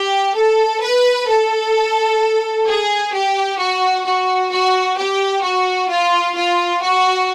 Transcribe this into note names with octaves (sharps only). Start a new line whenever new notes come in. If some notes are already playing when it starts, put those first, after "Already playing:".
Already playing: G4
A4
B4
A4
G#4
G4
F#4
F#4
F#4
G4
F#4
F4
F4
F#4